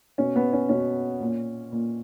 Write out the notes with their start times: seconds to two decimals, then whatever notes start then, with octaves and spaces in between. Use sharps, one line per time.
0.18 B2 C#4
0.36 B3
0.53 C#4
0.69 B2 C#4
1.20 A#2
1.72 A#2